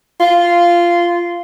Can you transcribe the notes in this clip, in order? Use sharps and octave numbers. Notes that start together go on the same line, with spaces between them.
F4